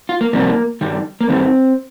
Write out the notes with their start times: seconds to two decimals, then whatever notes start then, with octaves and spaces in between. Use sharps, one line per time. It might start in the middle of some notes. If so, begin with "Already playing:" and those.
0.09 F4
0.21 A#3
0.33 F2 C3 D#3 G3 A#3
0.81 G2 D#3 G3
1.21 A#3
1.28 G2 D#3 G3 C4